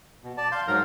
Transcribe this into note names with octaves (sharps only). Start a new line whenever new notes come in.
B2
D5 A5
F5 C6 G6
G#2 F#3 A#4